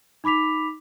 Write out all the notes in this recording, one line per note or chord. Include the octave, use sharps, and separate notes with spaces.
D#4 B5 D6 B6 F7